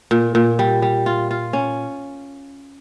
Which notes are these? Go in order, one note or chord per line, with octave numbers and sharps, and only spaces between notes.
A#2
A#2
G3
G3
F4
F4
C#4